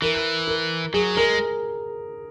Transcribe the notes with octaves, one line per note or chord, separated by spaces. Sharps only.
E3 A#4
A#4
F#3 G#4
G#3 A#4